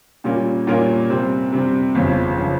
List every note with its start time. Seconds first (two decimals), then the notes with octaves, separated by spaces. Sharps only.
0.24 A#2 G3 C#4 F4 A#4
0.67 A#2 G3 C#4 F4 A#4
1.09 C3 G3 C4
1.52 C3 G3 C4
1.95 G1 F2 C#3 F3
2.38 C#3 F3